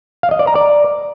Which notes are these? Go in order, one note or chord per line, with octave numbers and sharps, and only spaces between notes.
F5
D#5
D5
A#5
D5